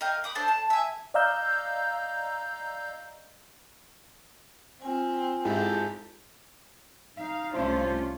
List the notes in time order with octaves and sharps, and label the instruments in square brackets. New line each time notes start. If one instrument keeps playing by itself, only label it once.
[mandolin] A#4 D#5 F5 G5
B5 D6 D#6
D4 A4 C5 D5
A5
E5 G#5
[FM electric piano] D5 D#5 F5 A#5 E6 G6
[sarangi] C4 [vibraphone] F4 G#5
[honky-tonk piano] G#2 E4 [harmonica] G4 A4 A5
[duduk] D#4 [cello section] F5
[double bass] C2 D4 [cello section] A3 C#4 F4 [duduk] C5